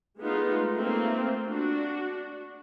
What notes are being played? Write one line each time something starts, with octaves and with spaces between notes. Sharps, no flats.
G#3 A3 B3 D#4 F4
A3 A#3 C4 F4
D4 F#4